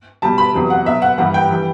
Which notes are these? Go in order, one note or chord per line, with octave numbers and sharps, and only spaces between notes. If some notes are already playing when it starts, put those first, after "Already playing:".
B2 G3 A5
B5
E2 C3 F#3
F#5
B2 F#3 E5
F#5
G2 E3 G3 F#5
G5
E3 G3